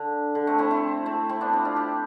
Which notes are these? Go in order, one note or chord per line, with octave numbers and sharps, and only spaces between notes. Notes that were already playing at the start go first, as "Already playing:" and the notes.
Already playing: D3
D3
A3 C4
C4 E4
C4 E4
A3 C4
C4 E4
B3 D4
C4 E4
D4 F4
E4 G4